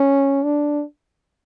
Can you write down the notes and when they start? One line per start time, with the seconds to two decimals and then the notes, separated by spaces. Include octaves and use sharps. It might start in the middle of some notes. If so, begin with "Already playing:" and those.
Already playing: C#4
0.44 D4